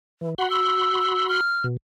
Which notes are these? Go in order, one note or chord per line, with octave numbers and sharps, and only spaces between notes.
E3
F#4 F#5 B5 C6
E6
F6
B2